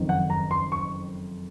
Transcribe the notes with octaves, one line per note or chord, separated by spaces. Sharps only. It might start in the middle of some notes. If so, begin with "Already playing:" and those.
Already playing: F#1 F2 D#3
F#5
A#5
C6
C#6